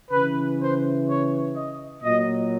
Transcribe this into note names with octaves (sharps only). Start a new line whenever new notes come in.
C#3 E3 B4
C5
C#5
D#5
A#2 F#3 D#5